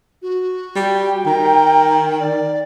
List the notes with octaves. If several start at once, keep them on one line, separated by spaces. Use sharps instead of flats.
F#4
G3 G5
D#3 A#5
D5